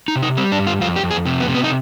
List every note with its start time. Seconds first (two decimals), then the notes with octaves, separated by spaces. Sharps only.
0.08 D#4
0.15 C3
0.23 D#4
0.37 G3 C4
0.52 D4
0.59 G2
0.67 F4
0.81 F2 F4
0.96 G4
1.03 F2
1.10 G#4
1.26 C3
1.40 B3
1.48 C3
1.55 B3
1.64 D#4